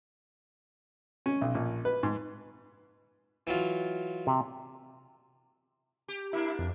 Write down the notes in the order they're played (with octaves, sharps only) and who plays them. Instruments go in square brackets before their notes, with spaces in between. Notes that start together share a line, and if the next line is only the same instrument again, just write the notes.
[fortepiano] C#4
B1
A#1
B4
G#2
[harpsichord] E3 F#3 F4
[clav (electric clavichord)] C3
[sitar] G4
[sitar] A#3 D4 [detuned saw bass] E4
[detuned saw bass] F2